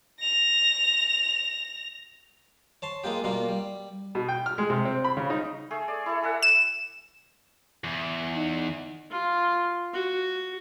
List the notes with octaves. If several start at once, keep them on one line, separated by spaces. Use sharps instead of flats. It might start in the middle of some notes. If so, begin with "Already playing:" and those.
A#6 F7
C#5 A5 C6
G#3 A#3 F4 G4
B2 G3 A#3 F4
G3
B2
G5
F6
G#3
C3
C4
B5
C#3
D#4
A3 G#4
D5
E4 A4
A4 E5 F#5
E7
E2
D#4
F4
F#4